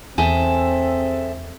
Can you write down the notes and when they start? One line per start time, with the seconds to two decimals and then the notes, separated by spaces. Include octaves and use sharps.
0.18 E2 C4 G#4 A4 E5